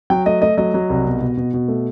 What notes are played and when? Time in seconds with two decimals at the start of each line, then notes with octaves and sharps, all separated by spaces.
0.10 F#3 G5
0.26 A3 D#5
0.42 A3 D#5
0.58 F#3 D#5
0.74 F#3
0.90 C2
1.05 B2
1.21 B2
1.37 B2
1.54 B2
1.68 A3